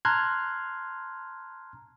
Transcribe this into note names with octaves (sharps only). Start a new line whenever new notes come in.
A5 A#5 C6 F6 F#6 G#6